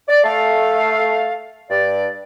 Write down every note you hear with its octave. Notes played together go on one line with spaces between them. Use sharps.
D5
A3 A4 F5
G2 D5